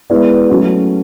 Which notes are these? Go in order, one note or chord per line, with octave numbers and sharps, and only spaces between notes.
G#3 B3 E4 B4 D5
F#3 A3 C#4 F#4